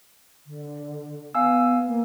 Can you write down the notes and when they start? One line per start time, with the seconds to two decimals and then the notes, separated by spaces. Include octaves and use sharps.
0.46 D3
1.35 B3 F5 G#5 E6
1.88 A#3